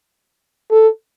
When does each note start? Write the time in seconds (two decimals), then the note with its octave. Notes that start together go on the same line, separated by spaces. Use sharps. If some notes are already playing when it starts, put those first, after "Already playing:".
0.71 A4